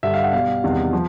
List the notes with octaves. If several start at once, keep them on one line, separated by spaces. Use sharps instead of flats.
G2 D3 G3 E5
F5
F#5
B2 G3 F5
E2 C3 D#3 G3
F3